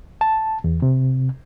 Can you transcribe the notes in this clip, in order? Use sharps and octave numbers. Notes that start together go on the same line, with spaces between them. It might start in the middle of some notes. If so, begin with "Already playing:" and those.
A5
E2
C3